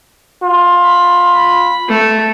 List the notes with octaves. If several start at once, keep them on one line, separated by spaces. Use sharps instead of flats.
F4
B5
B5
A3